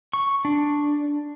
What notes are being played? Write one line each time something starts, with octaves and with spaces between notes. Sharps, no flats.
C#6
D4